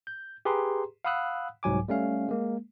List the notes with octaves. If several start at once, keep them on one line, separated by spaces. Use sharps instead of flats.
G6
G4 G#4 B4 A#5 C6
F5 F#5 B5 D#6 E6 F#6
C2 G#2 F#3 G#5 D6
G3 A3 C#4 F5
G#3 A#3